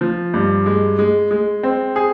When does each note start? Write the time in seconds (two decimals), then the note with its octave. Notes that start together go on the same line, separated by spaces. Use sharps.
0.01 F3
0.34 G2
0.66 G#3
0.99 G#3
1.31 G#3
1.63 C4
1.96 G#4